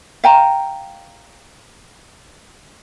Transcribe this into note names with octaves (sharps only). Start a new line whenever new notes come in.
F5 G5 A#5